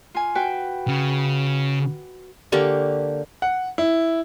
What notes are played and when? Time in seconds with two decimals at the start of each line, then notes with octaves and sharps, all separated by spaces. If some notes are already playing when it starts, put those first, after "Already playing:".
0.15 F4 G#5
0.35 F#4 B4 G5
0.88 C#3
2.52 D3 A#3 G4 C#6
3.42 F#5
3.78 E4